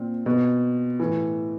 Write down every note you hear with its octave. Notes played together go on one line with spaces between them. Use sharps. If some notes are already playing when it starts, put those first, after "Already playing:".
Already playing: A#2 C4
B2
A2 E3